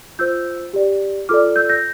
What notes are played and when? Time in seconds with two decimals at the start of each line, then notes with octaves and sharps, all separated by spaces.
0.19 F4 C5 E6 G6
0.73 G4 D5
1.29 F4 A4 D5 D6 F6
1.56 E6 G6
1.69 G6 A#6